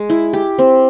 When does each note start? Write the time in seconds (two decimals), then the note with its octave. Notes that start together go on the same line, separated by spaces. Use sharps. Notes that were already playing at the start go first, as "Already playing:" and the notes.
Already playing: G#3
0.10 E4
0.33 G4
0.58 C4